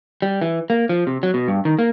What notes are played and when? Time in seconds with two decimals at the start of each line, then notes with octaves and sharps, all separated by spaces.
0.22 G3
0.41 E3
0.70 A#3
0.89 F3
1.07 C3
1.23 F#3
1.34 B2
1.48 G2
1.65 D#3
1.79 A#3